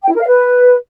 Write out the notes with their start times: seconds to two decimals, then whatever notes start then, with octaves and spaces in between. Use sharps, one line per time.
0.02 G5
0.08 E4
0.15 A#4
0.21 F5
0.27 B4